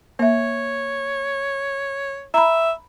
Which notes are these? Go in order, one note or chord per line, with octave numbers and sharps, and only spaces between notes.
A#3 C#5 E5
E5 A#5 B5